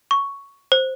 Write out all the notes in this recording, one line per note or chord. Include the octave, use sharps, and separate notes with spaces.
C#6
C5